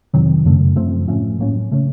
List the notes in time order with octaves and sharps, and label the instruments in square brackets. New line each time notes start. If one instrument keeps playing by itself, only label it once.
[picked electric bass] F2 C3 D#3 F#3
F#2 C#3 A3
F#2 F3 A3 C4
A2 F3 A3 C#4
A2 F#3 A#3 C#4
C#3 A3 C#4